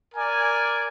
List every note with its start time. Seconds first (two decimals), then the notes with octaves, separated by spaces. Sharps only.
0.15 A#4 D5 G#5